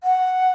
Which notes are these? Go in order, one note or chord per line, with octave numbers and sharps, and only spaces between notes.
F#5